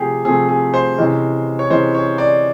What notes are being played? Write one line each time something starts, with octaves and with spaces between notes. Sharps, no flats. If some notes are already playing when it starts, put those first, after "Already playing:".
Already playing: C3 F3 A3 C4 G4 G#4
C3 F3 A3 C4 G#4
G#4
C5
C3 E3 G#3 C#4
C#5
C3 E3 G#3 C#4 C5
C#5
D5